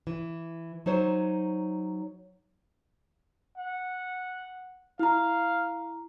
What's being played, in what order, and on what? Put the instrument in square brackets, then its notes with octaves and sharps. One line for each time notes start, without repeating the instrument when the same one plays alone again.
[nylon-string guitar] E3
F#3 D#4 C5 C#5
[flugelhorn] F#5
[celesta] E4 A#5 [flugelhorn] F5